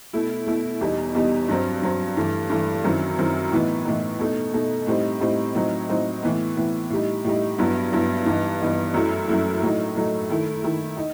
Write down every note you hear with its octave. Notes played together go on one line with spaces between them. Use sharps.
B2 A3 E4
B2 A3 E4
E2 B2 G3 D#4
E2 B2 G3 D#4
G2 F#3 C4
G2 F#3 C4
G2 E3 A3
G2 E3 A3
F#2 D#3 F#3 C4 E4
F#2 D#3 F#3 C4 E4
A2 E3 B3 D#4
A2 E3 B3 D#4
B2 A3 D#4
B2 A3 D#4
A2 G3 C4 D#4
A2 G3 C4 D#4
A2 F#3 C4 D#4
A2 F#3 C4 D#4
A2 E3 B3
A2 E3 B3
A2 G3 D#4
A2 G3 D#4
G2 F#3 B3 E4
G2 F#3 B3 E4
G2 E3 B3 D#4
G2 E3 B3 D#4
F#2 F#3 A3 E4
F#2 F#3 A3 E4
A2 F#3 A3 D#4
A2 F#3 A3 D#4
D#3 A3 E4
D#3 A3 E4
D#4